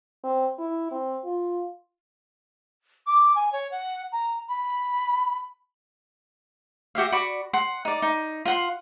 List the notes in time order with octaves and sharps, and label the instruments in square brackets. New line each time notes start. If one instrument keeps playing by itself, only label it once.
[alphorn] C4
E4
C4
F4
[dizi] D6
G#5
C#5
F#5
A#5
B5
[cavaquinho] F#4 G4 E5 F5
F#4 D5 B5 C#6
F#5 C6
D#4 D5
D#4
F4 F#5 C6